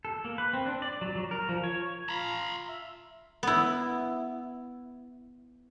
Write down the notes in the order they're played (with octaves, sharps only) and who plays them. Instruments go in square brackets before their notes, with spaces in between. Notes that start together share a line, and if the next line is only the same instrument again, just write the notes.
[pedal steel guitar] A4
A#3
B4
C4
D4
D5
F#3
F#3
A#4
F3
C#5
[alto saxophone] F4 [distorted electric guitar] A#5 B5
[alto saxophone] E5
[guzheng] B3 E4